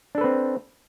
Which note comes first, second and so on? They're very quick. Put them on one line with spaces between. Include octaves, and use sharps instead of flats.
D4 A4 B4 C4